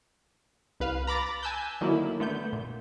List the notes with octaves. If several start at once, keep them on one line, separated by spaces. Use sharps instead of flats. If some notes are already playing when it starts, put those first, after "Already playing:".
C2 B4 F5
A#5 B5 D6 A6
G#5 A5 E6 F#6 G6
D3 D#3 F#3 A#3 E4
D3 A3 B3 G6
A#2